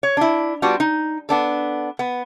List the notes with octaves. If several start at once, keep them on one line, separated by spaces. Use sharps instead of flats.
C#5
D4 E4
G3 B3 D4 F4 F#4
D#4
B3 D4 A4
B3